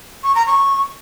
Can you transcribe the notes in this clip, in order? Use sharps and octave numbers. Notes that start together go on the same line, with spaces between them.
C#6
A#5
C#6